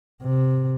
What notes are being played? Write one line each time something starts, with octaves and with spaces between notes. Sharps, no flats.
C3